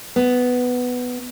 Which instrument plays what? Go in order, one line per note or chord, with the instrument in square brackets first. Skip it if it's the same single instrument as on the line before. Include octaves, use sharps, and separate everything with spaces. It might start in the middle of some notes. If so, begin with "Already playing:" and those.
[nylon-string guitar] B3